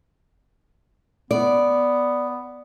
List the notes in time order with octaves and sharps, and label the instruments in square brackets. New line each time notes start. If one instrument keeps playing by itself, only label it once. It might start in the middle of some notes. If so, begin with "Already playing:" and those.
[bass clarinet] B3 [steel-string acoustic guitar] D5